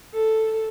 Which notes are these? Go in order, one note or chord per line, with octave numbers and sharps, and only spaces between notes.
A4